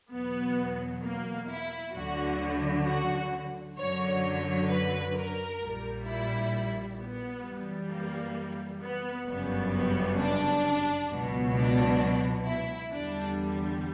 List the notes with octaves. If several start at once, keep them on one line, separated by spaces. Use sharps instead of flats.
E2 B2 F#3 B3
A#3
E4
D2 D3 F#3 F#4
F#4
F#2 D3 F#3 C#5
C#5
B4
A#4
A#1 A#2 G3
E4
B3
F#2 E3 G3
A#3
B3
G1 F#2 C#3 G3 B3
B3
D4
C#2 B2 F#3
D4
E4
E2 D3 G3 D4